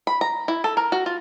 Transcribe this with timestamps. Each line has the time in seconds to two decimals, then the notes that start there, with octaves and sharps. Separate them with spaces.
0.07 B5
0.21 A#5
0.48 E4
0.64 A4
0.77 A#4
0.92 F#4
1.06 F4